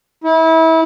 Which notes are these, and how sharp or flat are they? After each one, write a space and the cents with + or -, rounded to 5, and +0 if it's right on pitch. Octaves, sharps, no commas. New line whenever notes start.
E4 -30